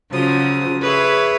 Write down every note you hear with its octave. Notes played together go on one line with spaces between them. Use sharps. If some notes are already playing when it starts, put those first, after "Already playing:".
C#3 F3 F#3 D#6
G#4 B4 C#5 E5